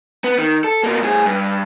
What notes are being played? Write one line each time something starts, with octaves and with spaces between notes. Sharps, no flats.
B3
D#3
A4
B2 A#3
A2 G#4
G2